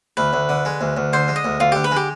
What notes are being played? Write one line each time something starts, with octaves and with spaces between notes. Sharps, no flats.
D2 B4
D2
D3
G#3
D2
D2
D3 C5
G#3
D#5
D2
D2 F4
D3 G4
B4
G#3 G4